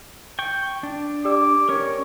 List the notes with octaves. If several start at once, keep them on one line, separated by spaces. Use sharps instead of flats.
G5 C#6
D4
G4 D5 D6 E6
C#4 A#4 C#5